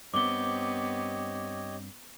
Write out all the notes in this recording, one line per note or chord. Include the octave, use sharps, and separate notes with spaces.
G2 B3 C4 G4 C#5 D#5 D6 G7